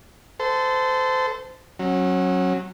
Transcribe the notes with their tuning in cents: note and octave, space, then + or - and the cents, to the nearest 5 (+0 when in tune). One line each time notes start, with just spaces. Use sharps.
A4 +0 C5 -25
F#3 +0 C#4 -30